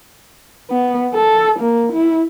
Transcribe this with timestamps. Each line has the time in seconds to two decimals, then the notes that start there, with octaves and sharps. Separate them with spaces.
0.71 B3
1.14 A4
1.60 A#3
1.93 E4